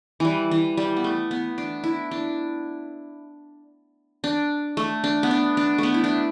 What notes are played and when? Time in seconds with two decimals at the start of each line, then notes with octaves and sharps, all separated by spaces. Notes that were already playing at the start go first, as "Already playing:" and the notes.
0.20 E3 G3
0.51 E3
0.77 G3
0.97 B3
1.04 A3
1.31 B3
1.58 D4
1.84 E4
2.11 D4
4.24 D4
4.77 A3
5.04 D4
5.23 B3
5.31 D4
5.57 D4
5.78 A3 B3
5.94 E4
6.04 D4